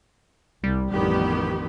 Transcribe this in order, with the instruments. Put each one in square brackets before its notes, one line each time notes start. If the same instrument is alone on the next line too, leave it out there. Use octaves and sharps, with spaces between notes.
[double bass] C2 [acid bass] G3
[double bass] A1 F2 [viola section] D#3 B3 G4